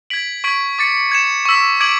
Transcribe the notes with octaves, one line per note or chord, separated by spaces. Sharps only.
G#6 B6 D7 F#7
C#6 G#6 B6 D7 F#7
D6 A6 C#7
G#6 C#7 E7
C#6 E6 B6
D6 G#6 D7 F#7